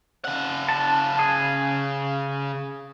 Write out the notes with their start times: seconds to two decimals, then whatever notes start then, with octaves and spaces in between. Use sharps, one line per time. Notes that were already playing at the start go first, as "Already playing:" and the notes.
0.25 C#3 F#5
0.69 A5
1.19 G#4